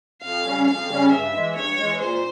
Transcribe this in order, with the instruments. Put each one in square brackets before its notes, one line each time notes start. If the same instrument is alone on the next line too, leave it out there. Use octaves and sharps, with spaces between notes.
[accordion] F2 [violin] F5
[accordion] C#3 G3 C#4
[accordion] F2 [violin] F5
[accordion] C#3 G3 C#4
[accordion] G2 [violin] E5
[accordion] E3 G#3
[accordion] G2 [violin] C#5
[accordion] E3 G#3
[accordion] A#2 [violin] C5